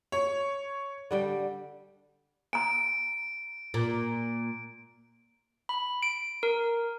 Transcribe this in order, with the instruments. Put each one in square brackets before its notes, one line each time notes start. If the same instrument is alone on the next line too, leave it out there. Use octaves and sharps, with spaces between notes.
[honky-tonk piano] C#5
[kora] D3 G3 G5
[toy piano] G#5 A#5 [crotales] D7
[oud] A#2
[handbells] B5
D7
A#4